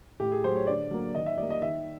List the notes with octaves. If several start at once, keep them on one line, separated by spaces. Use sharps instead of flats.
A2 G4
G#4
F#3 A3 C5
C#5
D3 D5
F#3 A#3
D#3 D#5
E5
G3 A#3 D5
D#5
D#3 E5